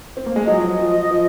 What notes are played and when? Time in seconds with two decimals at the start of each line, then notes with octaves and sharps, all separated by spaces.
0.17 C4
0.26 A#3
0.36 G#3
0.46 F#3 D#5
0.57 F3
0.62 F#3
0.79 F3
1.11 F3